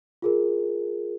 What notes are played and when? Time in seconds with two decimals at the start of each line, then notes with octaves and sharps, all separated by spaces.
0.22 F4 G#4 A#4